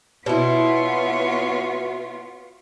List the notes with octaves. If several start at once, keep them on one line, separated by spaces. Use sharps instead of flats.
B2 B3 E4 F4 C#5